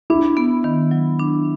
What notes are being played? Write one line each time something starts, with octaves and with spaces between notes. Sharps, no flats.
D4 E4
B3
D#3
F#3
D4